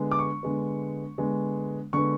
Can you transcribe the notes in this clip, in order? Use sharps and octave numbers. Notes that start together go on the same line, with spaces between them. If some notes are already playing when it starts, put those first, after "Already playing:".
Already playing: D3 G#3 B3
D6
C#6
D3 G#3 B3
D3 G#3 B3
D3 G#3 B3 C#6